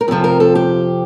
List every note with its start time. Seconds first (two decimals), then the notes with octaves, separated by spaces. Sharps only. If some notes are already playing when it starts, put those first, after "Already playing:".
0.01 A#4
0.08 F2 C3 F3 A4
0.24 A#4
0.40 A4
0.55 G4